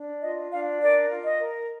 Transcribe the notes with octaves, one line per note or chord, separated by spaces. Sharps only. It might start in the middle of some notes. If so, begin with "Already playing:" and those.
Already playing: D4
F4 D#5
D4 F5
A#4 D5
F4
D#5
A#4